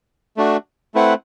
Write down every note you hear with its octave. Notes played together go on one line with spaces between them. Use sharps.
A3 D4 F#4
A3 C4 E4 B4 F#5